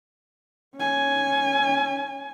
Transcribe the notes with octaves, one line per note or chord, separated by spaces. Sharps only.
C#4 G#5